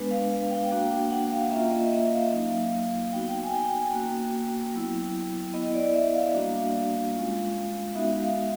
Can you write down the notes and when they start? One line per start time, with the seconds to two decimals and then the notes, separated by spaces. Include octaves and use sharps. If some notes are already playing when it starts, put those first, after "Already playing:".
Already playing: G#3 B3 D4 B4
0.11 F5
0.30 F5
0.51 G5
0.71 A#3 D4 F#4 G5
0.91 G5
1.11 F#5
1.32 F5
1.51 A#3 C#4 F4 E5
1.71 D#5
1.92 E5
2.11 F5
2.32 F#3 A#3 D#4
3.12 B3 D#4 F#4 G5
3.43 G#5
3.53 G5
3.93 A#3 C#4 F#4
4.74 F#3 B3 E4
5.54 B3 E4 D#5
5.74 D5
5.94 E5
6.14 F5
6.34 G3 A#3 D4 F#4
7.15 G#3 C#4 F4
7.95 G#3 B3 D#4 F#4 E5
8.22 F5